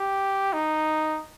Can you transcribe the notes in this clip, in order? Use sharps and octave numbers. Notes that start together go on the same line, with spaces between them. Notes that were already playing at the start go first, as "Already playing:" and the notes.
Already playing: G4
D#4